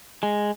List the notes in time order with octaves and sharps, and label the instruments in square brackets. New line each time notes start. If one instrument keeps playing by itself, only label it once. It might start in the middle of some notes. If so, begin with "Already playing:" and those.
[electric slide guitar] G#3